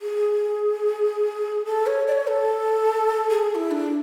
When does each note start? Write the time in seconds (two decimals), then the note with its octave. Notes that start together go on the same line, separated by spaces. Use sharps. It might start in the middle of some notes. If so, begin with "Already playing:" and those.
0.02 G#4
1.66 A4
1.87 C#5
2.07 D5
2.12 C#5
2.27 A4
3.30 G#4
3.51 G#4
3.55 E4
3.71 D4